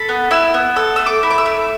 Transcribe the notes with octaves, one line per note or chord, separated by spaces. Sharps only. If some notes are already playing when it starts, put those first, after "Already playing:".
Already playing: A4 B5
B3
E4 E6
B3
A4 E6
A3 E6
D6
E4
D6
E6
A3